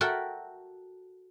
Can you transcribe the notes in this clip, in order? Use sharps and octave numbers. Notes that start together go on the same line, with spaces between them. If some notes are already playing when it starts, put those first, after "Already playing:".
F#4 A4 A#4 E5 F#5 G5